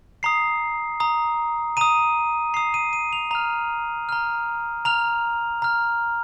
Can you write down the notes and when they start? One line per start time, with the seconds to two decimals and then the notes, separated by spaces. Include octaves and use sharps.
0.23 A#5 D#6 C7
1.00 A#5 D#6
1.77 A#5 D#6 D#7
2.54 A#5 D#6 C7
2.74 D#7
2.93 D#7
3.13 F7
3.31 A#5 F6 F7
4.09 A#5 F6
4.85 A#5 F6 F7
5.62 A#5 F6